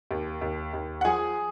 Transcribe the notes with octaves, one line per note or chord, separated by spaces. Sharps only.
D#2
D#2
D#2
F#5
F3 G#4 G#5